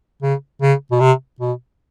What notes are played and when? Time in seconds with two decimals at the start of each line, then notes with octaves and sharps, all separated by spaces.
0.22 C#3
0.62 C#3
0.91 B2
1.00 C3
1.40 B2